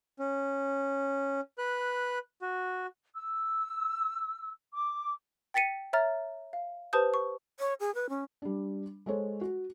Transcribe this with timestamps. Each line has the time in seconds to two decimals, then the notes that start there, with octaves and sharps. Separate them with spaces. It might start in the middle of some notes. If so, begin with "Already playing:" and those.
0.19 C#4
1.58 B4 F#6
2.42 F#4
3.14 E6
4.72 D6
5.54 G5 A6 B6 C#7 D#7
5.93 C#5 E5 A#5 F6 A6
6.53 F5
6.93 G4 B4 C5 A5 D#6 G6
7.14 C#6
7.59 C#5
7.80 G#4
7.95 B4
8.09 C#4
8.42 G3 D4
9.06 G#3 A4 C5 C#5
9.41 F#4